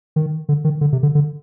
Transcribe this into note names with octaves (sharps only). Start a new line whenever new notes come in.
D#3
D3
D#3
D3
C3
D3
D3